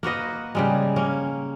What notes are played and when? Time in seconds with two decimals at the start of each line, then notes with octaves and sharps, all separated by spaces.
0.03 A#3 F#4 B4 D#5
0.55 C#3 G3 G#3
0.96 A#3 C#4